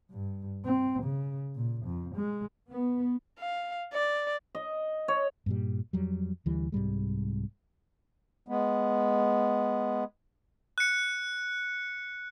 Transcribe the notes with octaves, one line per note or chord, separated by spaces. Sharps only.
G2
C4
C#3
A#2
F2
G#3
B3
F5
D5
D#5
C#5
G2 A#2 G3
F2 F#3 G3
D2 E3 G3
C2 G#2 G3 G#3
G#3 B3
F#6 C#7